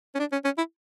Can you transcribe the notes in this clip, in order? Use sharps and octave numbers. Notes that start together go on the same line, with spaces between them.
C#4
D4
C#4
C#4
E4